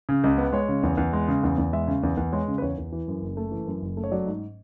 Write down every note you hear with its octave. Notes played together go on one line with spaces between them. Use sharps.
C#3
C#2
B3
G#3 C#5
C#3
E2
E2
G#3
C#3
E2
E2
G#3 E5
C#3
E2
E2
G#3 C#5
C#3
B4
E2 C#5
E2
E3
F#2
F#1
A3
E3
F#2
F#1
A3
C#5
F#3 D5
G#2